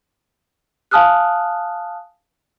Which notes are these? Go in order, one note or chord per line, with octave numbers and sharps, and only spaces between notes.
F5 G#5 A5 D#6 F6 F#6